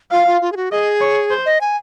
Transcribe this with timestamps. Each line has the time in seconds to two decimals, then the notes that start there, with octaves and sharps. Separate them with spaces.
0.11 F4 F5
0.27 F4
0.42 F4
0.52 G#4
0.57 F#4
0.72 G#4 D#5
1.01 C#5
1.30 C5
1.46 D#5
1.61 G#5